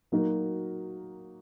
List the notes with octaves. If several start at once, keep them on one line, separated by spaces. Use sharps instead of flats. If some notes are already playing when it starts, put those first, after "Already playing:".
F#3 A#3 D#4 F#4 A#4